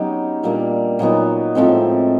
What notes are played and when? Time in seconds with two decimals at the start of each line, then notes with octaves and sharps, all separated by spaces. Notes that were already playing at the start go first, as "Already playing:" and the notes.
Already playing: F#3 B3 C#4 D#4 G4
0.43 A#2 G3 A#3 D4
0.99 A#2 F#3 B3 D#4
1.55 A2 F3 G#3 C4